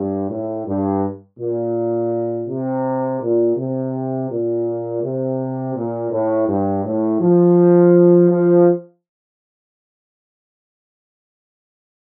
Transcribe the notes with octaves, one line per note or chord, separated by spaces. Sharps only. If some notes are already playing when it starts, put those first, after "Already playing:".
Already playing: G2
A2
G2
A#2
C3
A#2
C3
A#2
C3
A#2
A2
G2
A2
F3
F3